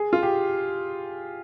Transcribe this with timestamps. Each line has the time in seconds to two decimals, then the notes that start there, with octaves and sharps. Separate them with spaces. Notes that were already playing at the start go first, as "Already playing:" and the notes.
Already playing: G#4
0.13 F4
0.23 G4